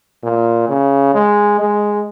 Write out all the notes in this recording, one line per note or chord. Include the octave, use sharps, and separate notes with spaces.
A#2
C#3
G#3
G#3